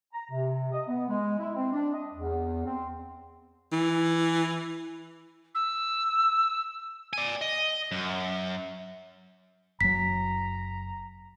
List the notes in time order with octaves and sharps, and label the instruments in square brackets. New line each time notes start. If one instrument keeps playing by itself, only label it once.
[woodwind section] A#5
C3
D#5
B3
G#3
E4
C4
D4
D#5
E2
C4
[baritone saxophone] E3
[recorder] E6
[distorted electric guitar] D5 G#5
D#5
F#2
[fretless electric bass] F#1 F#3 [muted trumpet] A#5 [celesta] B6